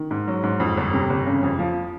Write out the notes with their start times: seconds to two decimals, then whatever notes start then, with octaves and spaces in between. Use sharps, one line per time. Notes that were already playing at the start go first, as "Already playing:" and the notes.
Already playing: D#3
0.11 G#2
0.28 F#3
0.43 G#2
0.60 F2
0.77 G1
0.93 C3
1.09 G1
1.26 C#3
1.43 F2
1.59 F3